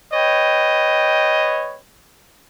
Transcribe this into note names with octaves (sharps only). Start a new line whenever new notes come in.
B4 C#5 D#5 G5